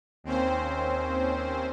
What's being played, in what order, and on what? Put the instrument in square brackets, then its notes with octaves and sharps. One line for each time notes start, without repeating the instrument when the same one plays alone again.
[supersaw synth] D#2 C4 C#4 C5